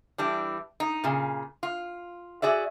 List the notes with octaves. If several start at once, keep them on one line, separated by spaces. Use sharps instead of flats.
E3 G3 D4
D#4
A#2 C#3
F4
F#4 G#4 D5 E5